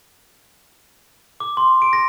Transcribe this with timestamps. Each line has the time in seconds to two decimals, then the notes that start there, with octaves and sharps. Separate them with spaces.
1.40 D6
1.57 C6
1.82 D7
1.93 A#6